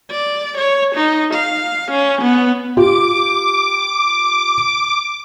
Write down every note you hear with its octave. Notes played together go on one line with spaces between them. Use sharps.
D5
C#5
D#4
F5
C#4
B3
F4 G4 D6